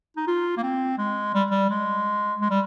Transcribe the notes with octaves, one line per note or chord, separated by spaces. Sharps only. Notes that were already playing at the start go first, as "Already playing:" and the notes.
D#4
F4
A#3
C4
G#3
G3
G3
G#3
G#3
G3